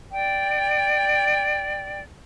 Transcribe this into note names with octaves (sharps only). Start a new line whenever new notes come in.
D5 G5